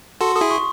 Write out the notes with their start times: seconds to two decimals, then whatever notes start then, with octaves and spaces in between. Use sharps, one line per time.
0.21 F#4 A4 C6
0.36 A4 D#6
0.41 E4 G#4
0.51 C#6